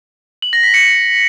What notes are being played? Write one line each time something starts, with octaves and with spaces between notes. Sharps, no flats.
F#7
A#6
B6
C#7